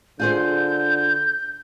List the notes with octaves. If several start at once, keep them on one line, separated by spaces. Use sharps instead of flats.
D3 F4 G#4 C5 G6